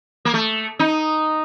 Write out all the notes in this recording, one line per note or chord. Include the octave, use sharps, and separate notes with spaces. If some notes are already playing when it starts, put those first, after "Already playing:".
A#3
A3
D#4